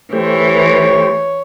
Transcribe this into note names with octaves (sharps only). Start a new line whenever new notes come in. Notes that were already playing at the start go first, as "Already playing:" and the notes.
E3 A3 G4 C5 C#5